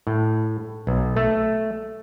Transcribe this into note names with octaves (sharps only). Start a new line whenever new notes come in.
A2
B1
A3